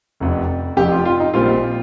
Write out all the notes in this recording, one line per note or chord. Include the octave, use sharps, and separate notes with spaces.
F1 F2 C3
F1 F2 C3 G4
F4
F4
D#4
A#1 A#2 G3 C4 F4